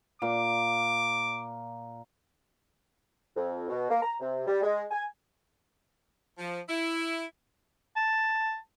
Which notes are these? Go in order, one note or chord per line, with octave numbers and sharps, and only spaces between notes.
A#2 D6
F2
B2
A#3
A#5
C3
G3
G#3
G#5
F3
E4
A5